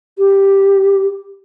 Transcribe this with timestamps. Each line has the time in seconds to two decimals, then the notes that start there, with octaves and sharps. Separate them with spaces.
0.19 G4